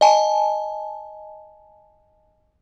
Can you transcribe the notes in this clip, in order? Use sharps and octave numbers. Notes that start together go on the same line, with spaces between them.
D#5 G#5 A5